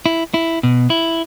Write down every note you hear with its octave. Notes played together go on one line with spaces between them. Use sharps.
E4
E4
B2
E4